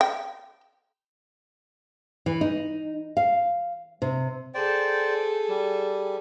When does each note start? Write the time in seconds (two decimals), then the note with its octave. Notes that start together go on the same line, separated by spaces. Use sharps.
0.01 G5
2.26 E3
2.41 D#4
3.17 F5
4.02 C3
4.54 G#4 A4 C5 D5 G5
5.49 G3